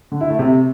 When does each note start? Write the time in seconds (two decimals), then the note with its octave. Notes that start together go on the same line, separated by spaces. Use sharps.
0.12 D3
0.21 E4
0.30 A3
0.39 C3